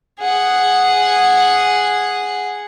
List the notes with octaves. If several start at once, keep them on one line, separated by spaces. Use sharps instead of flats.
G#4 F#5